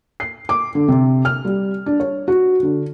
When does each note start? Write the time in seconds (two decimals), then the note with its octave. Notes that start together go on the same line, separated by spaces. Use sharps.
0.20 C7
0.49 D6
0.75 D3
0.88 C3
1.25 F6
1.45 G3
1.86 D4
2.00 C#5
2.28 F#4
2.63 D3